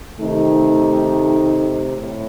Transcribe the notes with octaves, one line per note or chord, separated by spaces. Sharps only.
C3 D#3 A3 D#4
A2